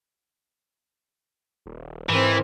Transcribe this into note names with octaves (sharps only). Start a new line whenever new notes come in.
D#1
G#2 E3 C4 A#4